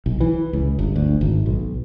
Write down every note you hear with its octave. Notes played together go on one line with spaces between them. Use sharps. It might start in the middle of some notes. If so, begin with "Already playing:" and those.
B1
E3
C#2
G1
D2
G#1
B1